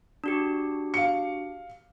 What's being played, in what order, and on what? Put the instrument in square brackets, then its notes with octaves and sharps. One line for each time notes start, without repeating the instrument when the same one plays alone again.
[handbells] D4 F#4 G4
[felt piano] F5 C#7